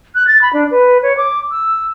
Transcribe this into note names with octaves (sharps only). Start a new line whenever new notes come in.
F#6
A6
B5
D4
B4
C#5
D6
E6